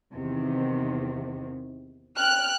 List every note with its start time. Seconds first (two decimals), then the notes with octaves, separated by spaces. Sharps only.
0.14 E2 C3 D#3
2.18 G5 F6 F#6